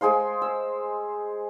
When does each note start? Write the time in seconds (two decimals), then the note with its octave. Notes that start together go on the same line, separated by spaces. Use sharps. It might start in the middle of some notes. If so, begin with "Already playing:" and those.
0.01 G#3 G#4 C5 F5
0.42 E6